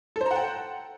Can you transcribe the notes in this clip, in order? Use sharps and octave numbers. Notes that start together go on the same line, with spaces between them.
A4 C5 F#5 G5 A#5